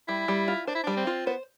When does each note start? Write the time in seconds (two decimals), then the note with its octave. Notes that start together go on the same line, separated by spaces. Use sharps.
0.08 G3 E4
0.28 G3
0.48 F4
0.67 D4 C5
0.75 E4
0.83 G3 D4
0.97 C4
1.07 F4
1.26 B3 C5